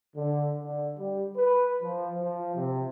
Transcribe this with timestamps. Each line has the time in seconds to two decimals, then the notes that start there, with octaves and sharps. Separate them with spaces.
0.15 D3
0.63 D3
0.97 G3
1.36 B4
1.81 F3
2.19 F3
2.55 C3